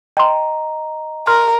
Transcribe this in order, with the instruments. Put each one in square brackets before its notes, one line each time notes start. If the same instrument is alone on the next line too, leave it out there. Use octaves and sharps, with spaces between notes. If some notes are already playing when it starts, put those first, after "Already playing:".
[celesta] D#5 A#5 [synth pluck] G5 C6
[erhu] A#4 [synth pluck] C6 F6